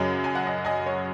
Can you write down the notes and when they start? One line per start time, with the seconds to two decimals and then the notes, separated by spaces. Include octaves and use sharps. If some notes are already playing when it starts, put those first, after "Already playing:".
Already playing: F#2 C#3 F#3 D#5 G#5
0.24 G#5
0.35 F#5
0.46 D#5 G#5
0.65 D#5 G#5
0.86 C#5